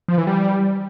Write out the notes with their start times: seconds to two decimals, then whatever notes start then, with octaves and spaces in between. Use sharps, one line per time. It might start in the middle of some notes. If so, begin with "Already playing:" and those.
0.08 F3
0.18 E3
0.27 G3